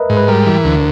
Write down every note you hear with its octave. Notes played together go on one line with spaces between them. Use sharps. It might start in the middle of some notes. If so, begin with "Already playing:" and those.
Already playing: A#4 B4 D#5 E5
G#2
B4
G3 A#4
E3
D2